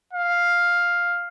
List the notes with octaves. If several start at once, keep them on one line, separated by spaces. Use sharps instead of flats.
F5